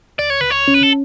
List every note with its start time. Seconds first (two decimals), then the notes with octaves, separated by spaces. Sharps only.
0.19 C#2 D5
0.30 C#5
0.41 C#2 B4
0.51 C#5
0.68 C#4
0.74 B4
0.83 A4